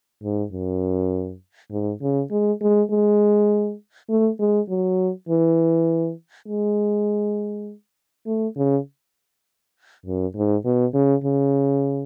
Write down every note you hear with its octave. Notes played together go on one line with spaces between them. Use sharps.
G#2
F#2
G#2
C#3
G#3
G#3
G#3
A3
G#3
F#3
E3
G#3
A3
C#3
F#2
G#2
B2
C#3
C#3